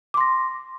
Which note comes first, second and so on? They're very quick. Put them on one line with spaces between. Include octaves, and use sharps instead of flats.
D6 C6 A#6